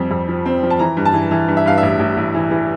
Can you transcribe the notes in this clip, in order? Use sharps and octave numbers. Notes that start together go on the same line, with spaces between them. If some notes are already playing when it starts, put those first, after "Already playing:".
Already playing: F2 G3 C4
F2
F3
C4
F3
A5
E3 A#5
G2
A5
E3
E3
G2
E5
G2 F5
A1 E5
A1
A1
E3
E3